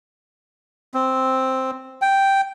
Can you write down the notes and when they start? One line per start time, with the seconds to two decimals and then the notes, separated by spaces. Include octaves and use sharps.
0.94 C4
2.02 G5